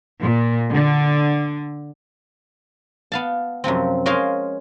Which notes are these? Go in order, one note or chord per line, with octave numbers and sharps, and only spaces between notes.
A#2
D3
B3 F5 A5
F#2 C3 F3 C4
G#3 C#4 G#4 A#4 C5 F5